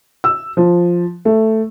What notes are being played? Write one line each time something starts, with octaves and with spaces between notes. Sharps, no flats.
E6
F3
A3